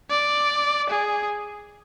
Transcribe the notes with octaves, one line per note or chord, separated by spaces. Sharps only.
D5
G#4